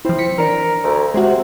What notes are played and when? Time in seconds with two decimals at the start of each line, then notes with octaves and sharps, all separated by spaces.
0.05 F3 C4 E4
0.19 B6 C#7
0.38 E3 D4 A#4
0.84 D2
1.14 C3 G#3 C4 F#4